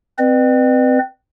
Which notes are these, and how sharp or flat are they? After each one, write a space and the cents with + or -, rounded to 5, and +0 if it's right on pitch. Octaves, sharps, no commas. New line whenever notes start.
C4 -15 B4 +0 D5 +45